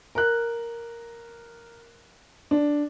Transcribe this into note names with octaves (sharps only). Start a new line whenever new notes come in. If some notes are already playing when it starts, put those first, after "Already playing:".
A#4 F#6
D4